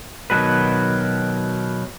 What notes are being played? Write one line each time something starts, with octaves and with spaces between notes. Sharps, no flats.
B2 D#3 F#3 G#3 F#4 B4